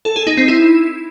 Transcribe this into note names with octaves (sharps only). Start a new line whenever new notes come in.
A4
G#4
D#4
C4
E4